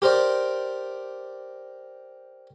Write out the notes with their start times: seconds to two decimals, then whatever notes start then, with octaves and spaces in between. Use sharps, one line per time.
0.02 G4 A#4 C5 D5